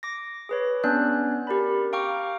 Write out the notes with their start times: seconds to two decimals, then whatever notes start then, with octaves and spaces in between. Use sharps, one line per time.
0.03 D6 A#6
0.49 G#4 B4 C#5
0.84 B3 C#4 D4 D5 F#6
1.47 G4 A#4 D5 B5
1.93 F5 G5 A#5 C#6 D6 F6